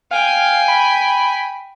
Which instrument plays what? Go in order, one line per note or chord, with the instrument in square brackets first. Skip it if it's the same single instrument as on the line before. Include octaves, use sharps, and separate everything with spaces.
[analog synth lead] F5 [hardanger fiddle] G5 G#5
[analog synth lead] B5